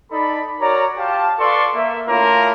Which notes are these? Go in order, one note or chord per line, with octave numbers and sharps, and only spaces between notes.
D#4 A4 D5 B5
F#4 A#4 C#5 D5 A#5
F4 G4 F5 A5
F4 A4 B4 D5 C6 C#6
A#3 E5
A3 A#3 C#4 E4 F4 A#4